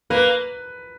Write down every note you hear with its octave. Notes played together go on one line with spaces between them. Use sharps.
A#3 B4